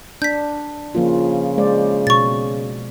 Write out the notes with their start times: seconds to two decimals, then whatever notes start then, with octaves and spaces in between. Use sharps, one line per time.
0.22 D4 G6 B6
0.95 C#3 F3 A#3 F4
1.58 G#3 C5 D5
2.07 B2 C#6 A6